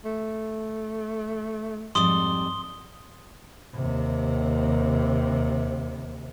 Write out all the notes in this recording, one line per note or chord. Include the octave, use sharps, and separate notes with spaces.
A3
F2 G#2 G3 C6 D#6 G7
D#2 C3